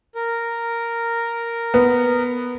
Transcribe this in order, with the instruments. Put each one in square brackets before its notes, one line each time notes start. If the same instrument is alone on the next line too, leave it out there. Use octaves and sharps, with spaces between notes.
[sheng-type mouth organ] A#4
[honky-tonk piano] B3